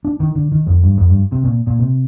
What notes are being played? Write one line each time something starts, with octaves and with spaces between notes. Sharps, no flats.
D4
D#3
D3
D#3
F2
G2
F2
G2
C3
A#2
A#2
C3